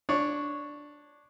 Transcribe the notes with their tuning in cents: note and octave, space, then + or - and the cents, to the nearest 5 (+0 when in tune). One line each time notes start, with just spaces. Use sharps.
D4 +0 C#5 +0